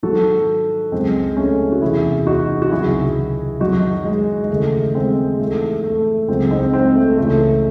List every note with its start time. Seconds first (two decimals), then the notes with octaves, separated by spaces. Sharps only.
0.03 G#2 D#3 F#3 F#4 A4
0.92 C#2 C#3 F#3 G#3 C4
1.37 A3 C#4
1.72 F#4
1.81 E2 C3 E3 E4 G#4
2.26 D#4 F#4
2.62 F#4
2.71 C#2 C3 D#3 F#3 E4 G#4
3.60 F#2 D#3 F#3 D#4 F#4
4.05 G#3
4.44 G#3
4.50 D#2 C#3 E3 A3
4.95 G#3 C4
5.39 G#2 E3 A3
5.84 A3
6.28 C#2 C#3 F#3 G#3 C4
6.51 C4 D#4
6.73 G#3 C4
6.95 A3
7.18 C#2 C#3 E3 A3